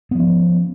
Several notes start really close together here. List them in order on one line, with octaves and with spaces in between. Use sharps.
B3 F3 C#4